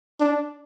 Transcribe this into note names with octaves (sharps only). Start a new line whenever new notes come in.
D4